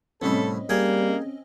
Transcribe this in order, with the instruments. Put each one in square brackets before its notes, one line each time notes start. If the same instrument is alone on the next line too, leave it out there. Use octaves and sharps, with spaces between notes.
[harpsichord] C2 A2 G3 [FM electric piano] C4 C#4 D#5 [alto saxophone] A4
[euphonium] G3 [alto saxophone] A#3 [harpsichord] G#4 G5 G#5